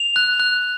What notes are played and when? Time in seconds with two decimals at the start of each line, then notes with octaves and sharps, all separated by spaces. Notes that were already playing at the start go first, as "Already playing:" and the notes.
Already playing: F7
0.16 F#6
0.40 F#6